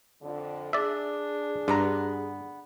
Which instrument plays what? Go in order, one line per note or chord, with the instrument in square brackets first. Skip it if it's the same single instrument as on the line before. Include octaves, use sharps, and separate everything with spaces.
[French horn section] F2 D3
[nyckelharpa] D4 [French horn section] G#4 [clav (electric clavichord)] D5 E5
[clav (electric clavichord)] G2 [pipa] D3 B3 A#5